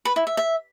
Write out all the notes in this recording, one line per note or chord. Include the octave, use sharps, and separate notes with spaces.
B4
E4
E5
E5